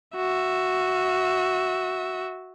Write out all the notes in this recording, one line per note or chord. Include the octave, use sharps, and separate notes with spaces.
F#4 E5